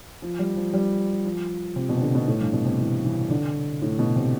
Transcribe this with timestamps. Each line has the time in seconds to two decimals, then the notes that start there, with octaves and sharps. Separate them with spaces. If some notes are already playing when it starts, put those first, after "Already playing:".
0.22 F3
0.39 G3
0.56 F3
0.73 G3
1.25 F3
1.76 C3
1.89 B2
1.97 C3
2.02 D3
2.15 B2
2.27 A2
2.41 G2
2.53 B2
2.65 C3
2.79 E3
3.04 E3
3.30 D3
3.82 A2
3.99 B2
4.16 C3